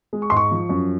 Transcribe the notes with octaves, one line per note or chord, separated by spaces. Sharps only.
G#3
C#6
G#2 C6
C#6
F3
F#2